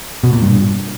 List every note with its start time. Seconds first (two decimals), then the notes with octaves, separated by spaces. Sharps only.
0.23 B2
0.33 A#2
0.42 G2